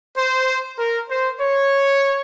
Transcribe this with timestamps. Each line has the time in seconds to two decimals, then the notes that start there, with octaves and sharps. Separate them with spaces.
0.16 C5
0.78 A#4
1.09 C5
1.40 C#5